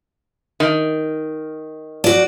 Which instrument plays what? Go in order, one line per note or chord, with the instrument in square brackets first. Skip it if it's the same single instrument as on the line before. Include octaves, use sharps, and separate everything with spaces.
[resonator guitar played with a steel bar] D#3
[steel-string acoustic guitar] F#4 D5